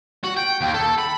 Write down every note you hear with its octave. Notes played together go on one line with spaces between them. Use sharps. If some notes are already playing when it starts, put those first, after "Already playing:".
F#4
G5
D#2
A4
B5